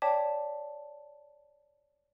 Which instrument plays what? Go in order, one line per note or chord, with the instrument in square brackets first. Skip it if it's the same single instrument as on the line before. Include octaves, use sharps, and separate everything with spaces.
[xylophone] C#5 D5 G5 A5 D6 B6